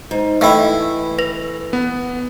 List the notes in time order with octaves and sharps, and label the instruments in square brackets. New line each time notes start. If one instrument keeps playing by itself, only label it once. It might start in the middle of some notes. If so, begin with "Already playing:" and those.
[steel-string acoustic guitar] G#2
[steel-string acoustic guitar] E3 [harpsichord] A3 E4 [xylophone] D#5 F5 G5
[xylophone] B4 A#6 F7
[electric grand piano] B3